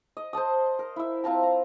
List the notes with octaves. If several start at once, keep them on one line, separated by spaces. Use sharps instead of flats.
D#5
C5 D#5 A5 D#6
A#4
E4 E5
C4 F4 A5 A#5
A#5